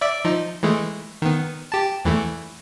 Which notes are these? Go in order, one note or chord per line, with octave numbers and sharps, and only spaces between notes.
D5 E5 D6
F3 D#4
E3 G#3 A3
D#3 B3
G4 A5
E2 E3 A3